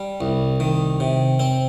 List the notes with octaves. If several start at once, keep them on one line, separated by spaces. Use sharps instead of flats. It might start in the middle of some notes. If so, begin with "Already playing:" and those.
Already playing: G3
C2
D#3
C3
C4